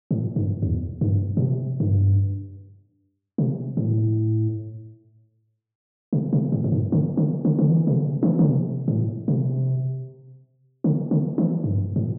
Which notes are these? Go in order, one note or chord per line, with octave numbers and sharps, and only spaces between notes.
A2
G2
E2
G2
A2
C3
G2
C3
A2
C3
C3
A2
A2
G2
D3
D3
D3
D3
E3
C3
D3
E3
D3
C3
A2
C3
D3
D3
E3
G2
A2